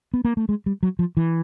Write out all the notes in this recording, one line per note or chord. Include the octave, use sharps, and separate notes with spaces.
B3
A#3
A3
G#3
G3
F#3
F3
E3